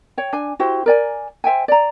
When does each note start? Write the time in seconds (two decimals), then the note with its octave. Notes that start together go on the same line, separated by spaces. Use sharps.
0.17 C#5 G5
0.33 D4 G#5
0.59 E4 F#4 G4 C5
0.86 A#4 D5 G#5
1.44 C5 E5 G5 G#5
1.68 D5 A#5